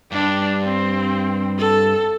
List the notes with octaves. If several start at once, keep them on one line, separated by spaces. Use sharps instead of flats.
G2 D4
C4
A4